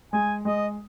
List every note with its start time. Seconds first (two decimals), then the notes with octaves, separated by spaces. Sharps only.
0.13 G#3 G#5
0.45 G#3 D#5